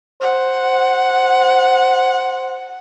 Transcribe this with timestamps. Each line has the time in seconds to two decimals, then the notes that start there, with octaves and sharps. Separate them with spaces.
0.22 C5 F#5